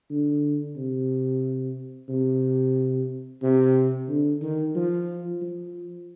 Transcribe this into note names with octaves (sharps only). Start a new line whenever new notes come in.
D3
C3
C3
C3
D3
D#3
F3
F3